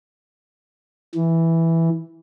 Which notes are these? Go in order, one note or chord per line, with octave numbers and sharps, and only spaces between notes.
E3